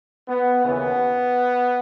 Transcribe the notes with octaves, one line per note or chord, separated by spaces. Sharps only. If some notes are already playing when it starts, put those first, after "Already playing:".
B3
D#2 C#3 E3 B3